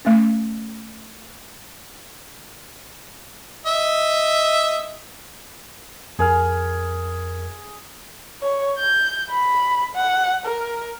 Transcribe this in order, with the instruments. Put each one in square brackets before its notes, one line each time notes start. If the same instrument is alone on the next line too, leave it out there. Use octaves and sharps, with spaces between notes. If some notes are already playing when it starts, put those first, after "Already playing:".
[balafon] A3 C#4
[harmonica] D#5 E5
[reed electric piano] F2 A#4 F6 [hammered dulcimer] G#4
[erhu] C#5
G6
B5
F#5
A#4